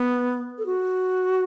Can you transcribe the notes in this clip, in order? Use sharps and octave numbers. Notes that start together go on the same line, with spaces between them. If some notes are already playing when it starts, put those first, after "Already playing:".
Already playing: B3
A4
F#4